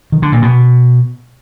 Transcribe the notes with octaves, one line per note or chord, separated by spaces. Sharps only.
D#3
D3
A#2
B2